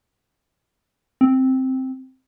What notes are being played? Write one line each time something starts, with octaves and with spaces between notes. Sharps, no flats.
C4